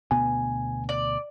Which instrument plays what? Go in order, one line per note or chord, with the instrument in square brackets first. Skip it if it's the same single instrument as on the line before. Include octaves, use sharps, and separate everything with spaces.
[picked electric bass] D2 B2 B3 [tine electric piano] G#5
[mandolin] D5